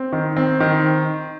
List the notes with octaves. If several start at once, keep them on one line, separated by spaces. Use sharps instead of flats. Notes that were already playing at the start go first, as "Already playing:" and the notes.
Already playing: C4
D#3
C4
D#3